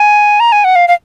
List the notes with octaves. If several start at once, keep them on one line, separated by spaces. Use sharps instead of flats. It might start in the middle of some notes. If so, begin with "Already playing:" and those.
Already playing: G#5
A#5
G#5
F#5
F5
F5